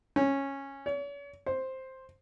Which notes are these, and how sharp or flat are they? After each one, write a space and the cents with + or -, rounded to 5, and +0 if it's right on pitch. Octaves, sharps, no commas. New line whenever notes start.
C#4 -10
C#5 +40
C5 +5